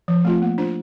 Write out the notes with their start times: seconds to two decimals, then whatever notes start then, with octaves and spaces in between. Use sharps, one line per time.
0.08 F3
0.25 A3 C4 F4
0.42 A#3
0.58 D4 F4 C5